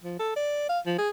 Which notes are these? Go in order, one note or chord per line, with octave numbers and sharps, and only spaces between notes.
F3
A4
D5
F5
F3
G#4